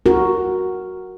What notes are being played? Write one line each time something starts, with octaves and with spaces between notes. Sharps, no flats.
F#4 A#4